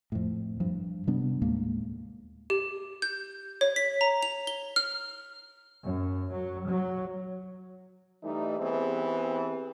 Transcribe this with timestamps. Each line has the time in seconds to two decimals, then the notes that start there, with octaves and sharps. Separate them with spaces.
0.12 F2 A2
0.60 G2 F3
1.07 C3 G3 B3 D4
1.42 D#2 A2 G#3 A#3
2.50 G4
3.02 G6
3.61 C#5
3.76 B6
4.01 A#5
4.23 F7
4.47 G7
4.76 F6
5.86 F#2
6.34 F#3
6.68 F#3
8.23 E3 G3 A3 D#4
8.59 E3 B3 C4 G4 G#4